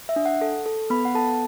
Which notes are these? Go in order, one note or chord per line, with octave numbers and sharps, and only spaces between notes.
E5
D4
F#5
A4
A4
B3 B5
F#5
A4 A5